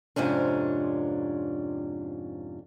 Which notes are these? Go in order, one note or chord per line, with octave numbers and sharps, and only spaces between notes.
F2 G#2 C3 C#4 D4